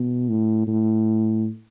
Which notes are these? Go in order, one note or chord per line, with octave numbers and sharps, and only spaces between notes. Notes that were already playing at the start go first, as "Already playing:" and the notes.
Already playing: B2
A2
A2